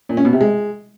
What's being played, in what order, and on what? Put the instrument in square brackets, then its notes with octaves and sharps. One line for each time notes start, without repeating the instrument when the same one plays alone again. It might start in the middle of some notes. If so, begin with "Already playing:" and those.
[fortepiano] A#2
C#4
B2
C3
G#3